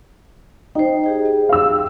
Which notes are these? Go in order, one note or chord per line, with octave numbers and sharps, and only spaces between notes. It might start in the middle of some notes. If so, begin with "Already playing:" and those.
D#4 C5 G5
G4 G#4 G5
F5 E6